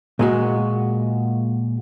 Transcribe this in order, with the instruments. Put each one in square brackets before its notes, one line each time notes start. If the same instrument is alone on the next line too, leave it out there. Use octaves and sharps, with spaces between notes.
[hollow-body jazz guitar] A#2 G#3 F#4